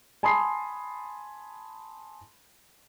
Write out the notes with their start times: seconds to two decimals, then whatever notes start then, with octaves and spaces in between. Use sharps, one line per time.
0.23 G#5 A5 B5 C6 D#6 C7